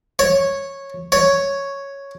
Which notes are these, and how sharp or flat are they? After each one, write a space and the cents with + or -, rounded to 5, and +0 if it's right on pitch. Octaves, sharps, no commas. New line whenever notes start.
C#5 -10
C#5 +0